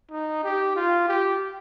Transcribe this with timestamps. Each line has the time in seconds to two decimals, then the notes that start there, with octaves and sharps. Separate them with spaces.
0.11 D#4
0.44 G4
0.76 F4
1.08 G4